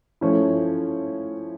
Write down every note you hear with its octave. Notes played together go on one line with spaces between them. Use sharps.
F3 A3 C#4 E4